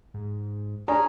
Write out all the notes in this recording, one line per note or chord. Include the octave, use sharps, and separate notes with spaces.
G#2
C#4 D4 G#4 A#5